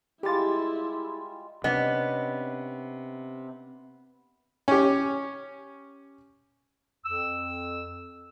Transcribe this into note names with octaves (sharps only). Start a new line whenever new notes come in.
G3 G#3 E4 F4 G4 A6
C3 B3 C#4 D4 D#5
C#4 G4
F2 E6